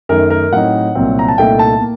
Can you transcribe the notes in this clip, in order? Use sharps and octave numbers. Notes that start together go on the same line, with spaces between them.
F#2 D#3 A3 A#4
A#4
A2 F#3 C4 D#4 F#5
C2 A#2 F#3 C4
A#5
A5
C2 A#2 A3 D#4 G5
A5
A#3